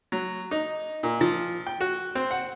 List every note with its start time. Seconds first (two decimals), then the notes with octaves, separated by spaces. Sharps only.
0.12 F#3
0.51 D#4
1.03 A#2
1.21 F3
1.67 G5
1.81 F#4
2.15 C4
2.31 F#5